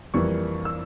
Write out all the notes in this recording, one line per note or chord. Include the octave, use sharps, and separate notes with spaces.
F2 E3 G3 A#3 C#6
E6